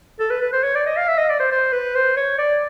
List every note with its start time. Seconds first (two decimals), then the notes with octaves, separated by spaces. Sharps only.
0.19 A4
0.30 B4
0.42 B4
0.53 C5
0.64 C#5
0.75 D5
0.86 D#5
0.97 F5
1.08 E5
1.18 D#5
1.30 D5
1.40 C5
1.51 C5
1.72 B4
1.95 C5
2.17 C#5
2.38 D5